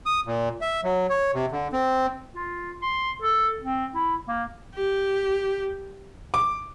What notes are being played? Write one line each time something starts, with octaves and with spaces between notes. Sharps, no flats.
D#6
A#2
E5
F#3
C#5
C3
D3
C4
F4
C6
A4
C4
E4
A#3
G4
D6